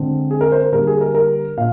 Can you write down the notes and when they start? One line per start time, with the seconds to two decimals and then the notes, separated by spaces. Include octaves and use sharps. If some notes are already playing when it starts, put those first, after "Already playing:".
Already playing: D3 G#3 C4
0.31 G#4
0.41 A#4
0.52 C5
0.62 A#4
0.72 D3 G3 A#3 A#4
0.87 G#4
1.01 A#4
1.15 A#4
1.57 A#2 F5